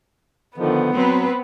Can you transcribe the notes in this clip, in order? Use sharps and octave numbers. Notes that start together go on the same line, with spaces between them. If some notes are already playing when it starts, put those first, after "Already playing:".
D3 D#3 F3 B3
F#3 C4 B4